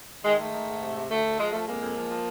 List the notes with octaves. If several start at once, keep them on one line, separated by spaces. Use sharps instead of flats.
D#3 G#3
G#3 A3
D#3
G#2
C3
C3
D2 A3
D2
F3 G#3
F3 A3
F2 G#3 A#3
F2
F3
F3